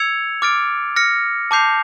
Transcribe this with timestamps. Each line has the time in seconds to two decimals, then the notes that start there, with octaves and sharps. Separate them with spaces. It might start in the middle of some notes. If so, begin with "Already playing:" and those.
Already playing: E6 G#6 C#7 F7
0.42 D6 F6 A6 D7
0.96 F6 A#6 C#7
1.51 A5 D6 G6 C7 F7